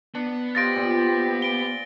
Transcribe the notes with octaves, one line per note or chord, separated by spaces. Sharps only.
B3 D4
G4 C5 D#5 F5 A6 A#6 D7
A#2
D7 G7